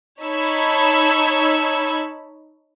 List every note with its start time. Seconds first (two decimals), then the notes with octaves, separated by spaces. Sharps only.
0.21 D#4 C#5 A5 B5 E6 G#6